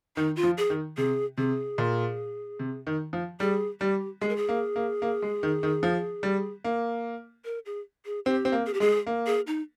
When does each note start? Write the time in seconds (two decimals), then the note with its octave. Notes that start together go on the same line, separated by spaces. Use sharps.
0.17 D#3 D#4
0.36 F4
0.43 F3
0.58 G#4
0.70 D#3
0.97 C3 G#4
1.38 C3 G#4
1.78 A#2
2.59 C3
2.87 D#3
3.13 F3
3.40 G3 G#4
3.80 G3 G4
4.21 G#3 G#4
4.29 A#4
4.36 G#4
4.49 A#3
4.76 A#3
5.02 A#3
5.22 G#3
5.43 D#3
5.63 D#3
5.83 F3
6.23 G3
6.64 A#3
7.45 A#4
7.66 G#4
8.06 G#4
8.26 C4 G4
8.45 C4
8.52 A#3
8.66 G#4
8.74 G4
8.80 G#3 G#4
9.07 A#3
9.26 G#4
9.47 D#4